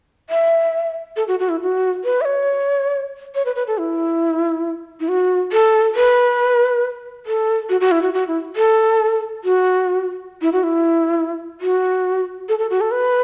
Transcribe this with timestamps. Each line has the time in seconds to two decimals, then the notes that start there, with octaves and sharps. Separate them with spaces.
0.30 E5
1.16 A4
1.28 F#4
1.39 F#4
1.49 E4
1.61 F#4
2.04 B4
2.21 E5
2.26 C#5
3.35 C#5
3.45 B4
3.56 B4
3.67 A4
3.78 E4
5.00 E4
5.09 F#4
5.52 A4
5.95 B4
7.26 A4
7.69 F#4
7.81 F#4
7.91 E4
8.03 F#4
8.14 F#4
8.28 E4
8.56 A4
9.44 F#4
10.42 E4
10.53 F#4
10.64 E4
11.61 F#4
12.49 A4
12.59 A4
12.70 F#4
12.81 A4
12.91 B4